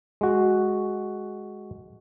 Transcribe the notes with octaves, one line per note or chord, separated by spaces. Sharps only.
G#3 F#4